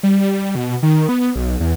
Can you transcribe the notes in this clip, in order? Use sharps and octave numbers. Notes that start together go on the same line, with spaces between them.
G3
B2
D#3
B3
B1
E2